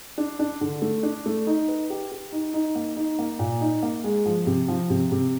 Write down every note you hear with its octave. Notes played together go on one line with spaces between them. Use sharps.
D4
D4
D3
A3
D4
A3
D#4
B4
G4
G4
D#4
D#4
A#3
D#4
A#3
A#2
D#4
A#3
G#3
F3
C3
F3
C3
C3